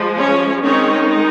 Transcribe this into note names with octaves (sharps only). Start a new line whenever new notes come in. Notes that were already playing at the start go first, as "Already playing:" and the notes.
Already playing: F3 G#3
C#4 C#5
D#3 G#3 C4 C#4 D#4 C#5